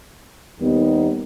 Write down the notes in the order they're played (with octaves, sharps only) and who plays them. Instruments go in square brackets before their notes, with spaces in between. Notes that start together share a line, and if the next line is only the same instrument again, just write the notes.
[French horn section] D#2 D#3 G3 B3 D#4